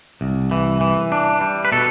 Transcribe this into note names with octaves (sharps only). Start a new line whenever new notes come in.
C2
E3
E3
D4
G3
B4
B2 A4